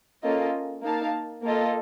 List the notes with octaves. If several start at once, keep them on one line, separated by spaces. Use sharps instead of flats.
A#3 C#4 F4 A4 D#5
A#3 D#4 A#4 F5 A5
A#3 F4 A4 D#5